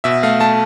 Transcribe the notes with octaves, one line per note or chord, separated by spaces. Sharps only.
B2 E5
A3 F5
A3 A5